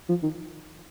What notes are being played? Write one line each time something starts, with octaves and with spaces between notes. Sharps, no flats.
F3
D#3